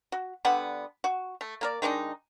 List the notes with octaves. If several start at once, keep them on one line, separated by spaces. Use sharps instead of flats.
F#4
D3 G3 B3 F#5
F#4
A3
A#3 A#4 D5
D#3 G#3 D4 D#4